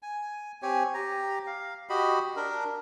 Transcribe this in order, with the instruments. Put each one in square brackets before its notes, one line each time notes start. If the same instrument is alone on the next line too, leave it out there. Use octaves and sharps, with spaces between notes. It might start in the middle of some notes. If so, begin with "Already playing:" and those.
[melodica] G#5
C4 G4 C#5 G#5
G4 A#5
F5
F#4 G4 D#5 B5
D4 A#4